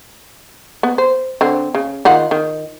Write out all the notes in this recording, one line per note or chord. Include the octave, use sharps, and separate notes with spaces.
B3
C5
D3 C4
C#3
D#3 F4 F#5
D#3